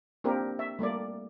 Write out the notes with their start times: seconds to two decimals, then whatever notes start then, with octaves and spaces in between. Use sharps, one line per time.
0.24 A#3 C4 D4 G4 A#4
0.59 E5
0.79 G3 A3 A#3 D5